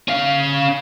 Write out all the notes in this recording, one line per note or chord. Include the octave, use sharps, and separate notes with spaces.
C#4 F5